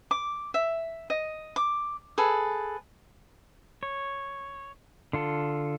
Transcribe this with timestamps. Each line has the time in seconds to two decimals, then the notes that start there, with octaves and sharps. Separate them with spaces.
0.11 D6
0.54 E5
1.10 D#5
1.56 D6
2.18 G#4 A4 B4
3.83 C#5
5.13 D3 F4 A4